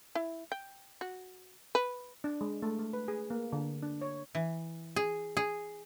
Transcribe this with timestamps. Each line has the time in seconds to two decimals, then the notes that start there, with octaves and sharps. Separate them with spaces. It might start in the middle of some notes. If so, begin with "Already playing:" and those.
0.15 E4
0.52 G5
1.01 F#4
1.75 B4
2.24 D4
2.41 G#3
2.62 A3
2.79 A3
2.93 B4
3.08 G#4
3.30 A#3
3.53 D3
3.83 D4
4.01 C#5
4.35 E3
4.96 G#4
5.37 G#4